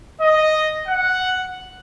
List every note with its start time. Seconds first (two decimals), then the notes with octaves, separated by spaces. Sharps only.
0.19 D#5
0.88 F#5